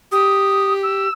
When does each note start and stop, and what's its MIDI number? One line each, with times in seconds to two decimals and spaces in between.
0.12 1.07 67
0.12 0.73 87
0.83 1.12 88